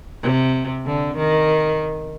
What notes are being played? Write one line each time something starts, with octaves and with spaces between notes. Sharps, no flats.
C3
D3
D#3